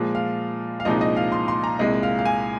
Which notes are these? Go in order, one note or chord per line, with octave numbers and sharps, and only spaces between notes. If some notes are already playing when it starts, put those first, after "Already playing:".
Already playing: A#2 F3 G#3
F5
F5
C2 A#2 F3 G#3 D#4 D#5
D#5
F5
C6
C6
A#5
C2 A#2 G#3 D#5
F5
F5
G#5